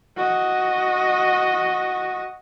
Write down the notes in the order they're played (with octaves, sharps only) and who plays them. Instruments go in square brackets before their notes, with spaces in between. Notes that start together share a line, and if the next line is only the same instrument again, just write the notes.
[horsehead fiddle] F#4 D#5